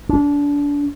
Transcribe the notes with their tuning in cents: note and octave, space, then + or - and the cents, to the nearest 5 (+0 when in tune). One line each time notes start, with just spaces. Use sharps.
D4 -30